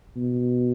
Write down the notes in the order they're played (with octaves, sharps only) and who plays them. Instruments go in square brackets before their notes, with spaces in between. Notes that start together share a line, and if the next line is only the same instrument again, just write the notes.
[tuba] B2